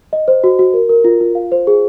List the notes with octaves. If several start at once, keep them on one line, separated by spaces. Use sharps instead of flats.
D#5
C5
F#4
F#4
A#4
A#4
F4
F4
F5
C5
G#4